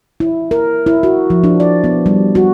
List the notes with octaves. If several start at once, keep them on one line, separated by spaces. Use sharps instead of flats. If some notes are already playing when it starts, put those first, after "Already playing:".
E4
A#4
E4
F#4
F3
D4
D5
B3
G3
F#4